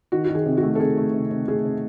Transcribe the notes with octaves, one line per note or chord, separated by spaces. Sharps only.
D#3 F#4
D#3 F#4
G#4
C3
F#4
A3
A4
C3 G#4
A3
C3
C3
A3 G#4
C3